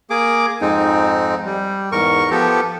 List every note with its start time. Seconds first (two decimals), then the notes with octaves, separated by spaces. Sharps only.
0.10 A#3 G#4 D6
0.61 F2 G#2 G#3 C4 D#4
1.46 G3
1.92 E2 G#2 A#4 C#6
2.31 F3 B3 G4 A4